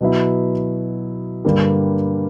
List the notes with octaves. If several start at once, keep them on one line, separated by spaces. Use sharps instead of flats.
B2 F#3 B3 E4
G2 D3 G3 A#3